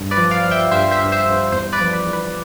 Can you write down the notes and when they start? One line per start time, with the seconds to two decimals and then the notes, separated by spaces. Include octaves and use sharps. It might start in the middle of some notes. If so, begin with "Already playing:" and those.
Already playing: G2
0.11 B4 D5
0.17 F3
0.31 D5 F5
0.44 F3
0.51 E5 G5
0.71 G2 C5 E5
0.91 C5 E5
0.99 G2
1.12 C5 E5
1.25 G2
1.32 C5
1.52 E2 C5
1.73 B4 D5
1.80 F3
1.93 B4
2.06 E2
2.13 B4